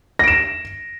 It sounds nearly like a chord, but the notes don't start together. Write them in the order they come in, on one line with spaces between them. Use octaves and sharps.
A#6 D7 E7